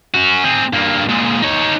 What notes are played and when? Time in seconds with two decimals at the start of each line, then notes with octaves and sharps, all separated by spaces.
0.14 C#4 F#4
0.44 C4 G#4
0.73 G2 A#3
1.09 A#2 G#3
1.42 D#4 C#5